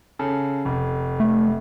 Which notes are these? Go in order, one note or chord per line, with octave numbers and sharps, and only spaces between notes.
C#3 A4
F1
A3